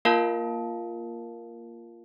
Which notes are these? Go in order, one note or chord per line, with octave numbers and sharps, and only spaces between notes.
A#3 F4 A#4 F5 A5